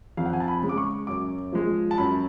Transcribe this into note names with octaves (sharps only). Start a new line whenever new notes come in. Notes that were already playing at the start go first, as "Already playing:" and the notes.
F2 F5
F#5
G#5
A5
B5
C#3 G#3
D6
C#6
F#2 D6
F3 G#3
A5
F#2 B5